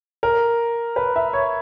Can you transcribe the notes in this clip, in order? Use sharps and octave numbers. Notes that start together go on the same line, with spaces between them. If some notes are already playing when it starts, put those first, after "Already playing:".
A#4
B4
E5
C#5